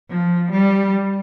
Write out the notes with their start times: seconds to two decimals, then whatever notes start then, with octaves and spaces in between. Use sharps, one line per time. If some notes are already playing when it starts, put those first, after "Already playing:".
0.10 F3
0.52 G3